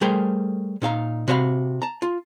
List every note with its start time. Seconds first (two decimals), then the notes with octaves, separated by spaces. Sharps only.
0.01 G3 A3 G#4 A#4 C5 G5
0.82 A#2 D#4 F5 A#5
1.28 C3 F#4 C5 D#5 F5 B5
1.82 A5 A#5
2.02 F4